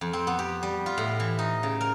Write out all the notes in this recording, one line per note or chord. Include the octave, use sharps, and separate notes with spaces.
F2
C4
B3
G4
G3
F4
A2
E3
D#4
C#3
A#4